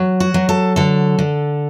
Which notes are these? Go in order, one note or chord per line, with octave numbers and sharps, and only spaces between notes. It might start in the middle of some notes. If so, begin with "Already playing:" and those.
Already playing: F#3
F#4
F#3
A4
D3 A4
D3